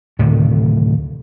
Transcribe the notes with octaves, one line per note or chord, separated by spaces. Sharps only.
D2 A2 C3 D#3